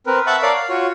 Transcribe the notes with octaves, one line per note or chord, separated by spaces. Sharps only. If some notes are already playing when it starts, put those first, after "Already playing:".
C4 A#4 B4
E5 F#5 A5 B5 C#6
A#4 C#5 D5 F5 A5
F5
F4 F#4 C#5